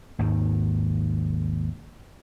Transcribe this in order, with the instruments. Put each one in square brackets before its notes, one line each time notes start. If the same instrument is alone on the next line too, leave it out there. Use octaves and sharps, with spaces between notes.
[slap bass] G#1 D#2 G#2 D#3